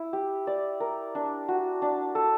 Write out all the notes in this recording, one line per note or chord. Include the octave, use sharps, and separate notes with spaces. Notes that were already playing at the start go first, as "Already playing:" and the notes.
Already playing: E4
G4
D5
A#4
D4
F#4
D4
A4